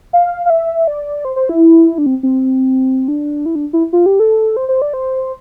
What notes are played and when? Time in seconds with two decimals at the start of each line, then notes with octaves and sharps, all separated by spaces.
0.13 F5
0.46 F5
0.50 E5
0.87 D5
1.25 C5
1.36 C5
1.49 E4
1.98 D4
2.06 C4
2.23 C4
3.08 D4
3.46 E4
3.55 D4
3.73 E4
3.93 F4
4.06 G4
4.20 A4
4.57 C5
4.69 C5
4.82 D5
4.94 C5